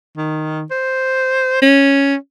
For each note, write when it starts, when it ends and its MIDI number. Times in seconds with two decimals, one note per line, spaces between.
0.17 0.64 51
0.71 1.61 72
1.62 2.15 61